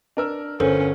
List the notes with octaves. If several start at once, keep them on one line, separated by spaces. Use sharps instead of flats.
D4 A#4 E6
G1 C#4 A4 A#4 C5